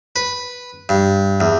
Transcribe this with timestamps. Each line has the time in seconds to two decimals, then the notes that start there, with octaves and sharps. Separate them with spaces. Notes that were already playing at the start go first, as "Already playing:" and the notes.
0.16 B4
0.89 G2
1.40 E2